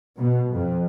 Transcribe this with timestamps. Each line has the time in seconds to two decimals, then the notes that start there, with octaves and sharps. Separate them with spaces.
0.16 B2
0.53 F2